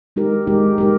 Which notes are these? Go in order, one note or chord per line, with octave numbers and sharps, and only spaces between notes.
G#3 D#4 G4 A#4
G#3 D#4 G4 A#4
G#3 D#4 G4 A#4